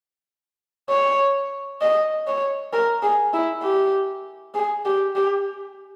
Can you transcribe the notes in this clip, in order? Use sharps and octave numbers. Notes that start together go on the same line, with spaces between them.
C#5
D#5
C#5
A#4
G#4
E4
G4
G#4
G4
G4